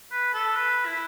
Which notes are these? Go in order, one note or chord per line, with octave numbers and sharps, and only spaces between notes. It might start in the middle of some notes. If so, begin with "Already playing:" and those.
B4
A4
B4
E4